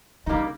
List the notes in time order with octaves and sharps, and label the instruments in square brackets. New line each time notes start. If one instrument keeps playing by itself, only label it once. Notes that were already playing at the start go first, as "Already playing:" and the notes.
[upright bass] C#3 [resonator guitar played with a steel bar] G3 A#3 D#4